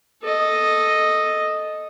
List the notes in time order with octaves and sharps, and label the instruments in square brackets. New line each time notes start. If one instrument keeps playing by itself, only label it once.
[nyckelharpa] A4 D#5